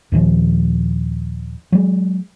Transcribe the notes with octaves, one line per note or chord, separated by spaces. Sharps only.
D#2 A#2 D#3 F3
F#3 G#3